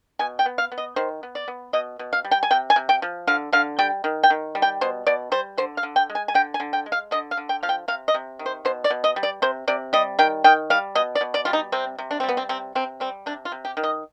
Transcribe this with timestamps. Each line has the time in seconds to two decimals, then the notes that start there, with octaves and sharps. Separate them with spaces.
0.19 B2 G#5
0.39 G5
0.46 B3
0.58 F5
0.72 B3
0.78 D#5
0.96 D#3 C5
1.23 B3
1.35 D5
1.48 B3
1.73 B2 D#5
1.99 B2
2.13 F5
2.24 G3
2.31 G5
2.43 G#5
2.51 C3 G5
2.70 G#5
2.76 C3
2.89 G5
3.02 F3
3.27 D3 F5
3.53 D3 F5
3.79 G3 G5
4.04 D#3
4.24 G5
4.30 D#3
4.55 G3
4.62 G5
4.81 B2 C5
5.07 B2 D5
5.32 G3 C5
5.58 D3 C5
5.77 F5
5.83 D3
5.96 G5
6.10 G#3
6.15 G#5
6.28 G#5
6.34 D3 G5
6.54 G#5
6.60 D3
6.73 G5
6.86 G#3
6.92 F5
7.11 D3 D#5
7.31 F5
7.37 D3
7.49 G5
7.63 F3 F5
7.69 G5
7.88 C3 F5
8.08 D#5
8.14 C3
8.39 D#3
8.46 C5
8.65 B2 C5
8.84 D5
8.90 B2
9.04 D#5
9.16 G3
9.23 D5
9.42 C3 C5
9.68 C3 D5
9.93 G3 D#5
10.19 D#3 G5
10.44 D#3 G5
10.70 G3 F5
10.95 B2 D#5
11.15 D5
11.21 B2
11.34 D5
11.45 G3 F4
11.53 D#4
11.72 C3 C4
11.98 C3
12.11 D4
12.20 G3 C4
12.29 B3
12.37 C4
12.49 C3 C4
12.75 C3 C4
13.00 G3 C4
13.26 C3 D4
13.45 F4
13.52 C3
13.65 G4
13.77 D#3
13.83 D#5